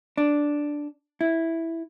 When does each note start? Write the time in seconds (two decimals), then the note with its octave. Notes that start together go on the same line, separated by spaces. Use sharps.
0.17 D4
1.21 E4